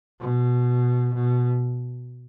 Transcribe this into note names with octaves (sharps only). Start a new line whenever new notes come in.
B2
B2